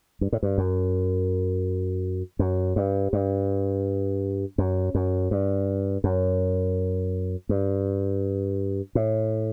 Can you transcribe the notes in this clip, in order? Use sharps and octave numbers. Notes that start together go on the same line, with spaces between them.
G2
A2
G2
F#2
F#2
G2
G2
F#2
F#2
G2
F#2
G2
A2